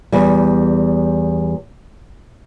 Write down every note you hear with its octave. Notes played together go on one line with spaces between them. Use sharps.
E2 G3